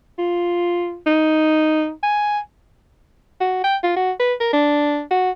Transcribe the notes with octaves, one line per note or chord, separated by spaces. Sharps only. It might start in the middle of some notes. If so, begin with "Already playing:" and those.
F4
D#4
G#5
F#4
G5
F4
F#4
B4
A#4
D4
F#4